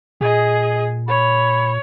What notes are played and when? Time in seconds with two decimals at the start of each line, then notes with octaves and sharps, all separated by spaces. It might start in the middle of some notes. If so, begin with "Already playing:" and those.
0.21 A#2 G#4 D#5
1.08 C#5 B5